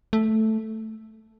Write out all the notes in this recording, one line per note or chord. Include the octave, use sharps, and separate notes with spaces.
A3